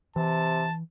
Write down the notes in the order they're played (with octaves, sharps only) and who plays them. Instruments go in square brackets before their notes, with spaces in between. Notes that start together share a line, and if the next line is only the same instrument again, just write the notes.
[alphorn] C3 [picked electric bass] E3 [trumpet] A5